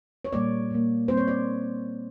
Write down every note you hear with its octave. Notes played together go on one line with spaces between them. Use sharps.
C#5
A#2 G3 A#3 D5
A#2 G3 A#3
A#2 G3 C4 C5
C#5
D5